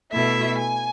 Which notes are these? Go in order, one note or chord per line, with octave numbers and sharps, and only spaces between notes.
B2 A3 E4 E5
G#5